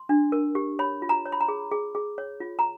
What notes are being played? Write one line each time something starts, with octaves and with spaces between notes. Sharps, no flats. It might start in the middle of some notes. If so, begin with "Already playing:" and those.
Already playing: C6
D4
A#4
G4
C#5 B5
F4
A#5
C#5
B5
A#5
G#4
G#4
G#4
C#5
F4
A#5